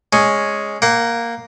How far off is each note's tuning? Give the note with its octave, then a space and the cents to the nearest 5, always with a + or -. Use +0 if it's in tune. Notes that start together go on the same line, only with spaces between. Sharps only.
G#3 +0 C#4 +0
A#3 +0 F#5 +40